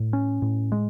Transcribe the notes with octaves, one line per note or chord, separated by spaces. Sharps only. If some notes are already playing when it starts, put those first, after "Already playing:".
Already playing: A2
C#4
A2
G#3